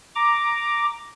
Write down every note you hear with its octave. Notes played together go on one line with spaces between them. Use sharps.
A#5 D6